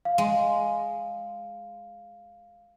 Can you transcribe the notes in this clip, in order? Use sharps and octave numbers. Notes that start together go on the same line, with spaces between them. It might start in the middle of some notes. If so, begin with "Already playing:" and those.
F5
G#3